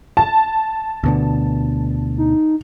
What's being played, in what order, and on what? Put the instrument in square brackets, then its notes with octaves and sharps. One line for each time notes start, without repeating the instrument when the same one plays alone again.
[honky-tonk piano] A5
[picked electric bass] D2 B2 D3
[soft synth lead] D#4